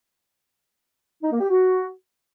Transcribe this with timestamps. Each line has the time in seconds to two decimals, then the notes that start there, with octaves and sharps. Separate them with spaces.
1.23 D#4
1.31 A#3
1.40 G4
1.49 F#4